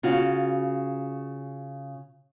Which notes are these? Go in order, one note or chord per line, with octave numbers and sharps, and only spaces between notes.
C#3 F4 F#4